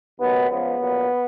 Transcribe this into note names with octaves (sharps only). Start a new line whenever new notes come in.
D#2 D#3 F#3 B3
C#2 C#3 F3 B3
A#1 A#2 F#3